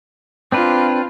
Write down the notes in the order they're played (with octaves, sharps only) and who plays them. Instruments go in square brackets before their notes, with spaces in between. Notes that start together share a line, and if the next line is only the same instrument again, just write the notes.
[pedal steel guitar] C4 D4 B4 [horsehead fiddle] F4